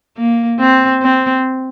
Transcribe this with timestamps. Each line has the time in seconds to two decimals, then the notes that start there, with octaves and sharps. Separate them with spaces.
0.18 A#3
0.59 C4
1.02 C4